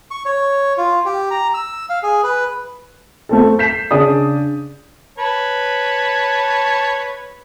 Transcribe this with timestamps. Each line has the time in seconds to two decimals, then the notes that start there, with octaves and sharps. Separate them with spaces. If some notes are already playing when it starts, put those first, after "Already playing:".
0.11 C#6
0.26 C#5
0.78 F4
1.05 G4
1.31 A#5
1.54 E6
1.89 F5
2.03 G#4
2.24 B4
3.29 A3 C4 A4
3.59 G6 B6 C7 E7
3.91 C#3 D4 G#4 D5 D#6
5.18 B4 C#5 A5